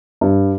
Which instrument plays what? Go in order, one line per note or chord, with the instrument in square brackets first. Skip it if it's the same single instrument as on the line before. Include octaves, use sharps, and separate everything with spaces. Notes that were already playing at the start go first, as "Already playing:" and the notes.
[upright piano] G2